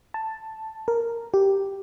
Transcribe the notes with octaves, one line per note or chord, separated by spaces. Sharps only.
A5
A#4
G4